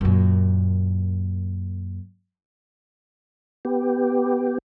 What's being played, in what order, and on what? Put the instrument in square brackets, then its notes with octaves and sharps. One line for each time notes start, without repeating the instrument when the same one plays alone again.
[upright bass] F#2 A#2
[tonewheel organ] B3 G4